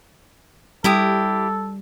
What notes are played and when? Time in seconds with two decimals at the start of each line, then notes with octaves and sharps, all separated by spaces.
0.84 G3 E4 G4 A4 D#6